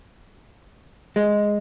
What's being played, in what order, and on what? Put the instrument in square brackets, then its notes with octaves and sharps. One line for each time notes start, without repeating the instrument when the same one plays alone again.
[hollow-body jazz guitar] G#3